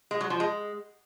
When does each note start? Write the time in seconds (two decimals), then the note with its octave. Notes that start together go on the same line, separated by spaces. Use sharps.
0.11 G#3
0.21 F#3
0.30 F3
0.40 G#3